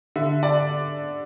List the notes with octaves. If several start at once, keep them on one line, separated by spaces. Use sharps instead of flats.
D3 E5
D5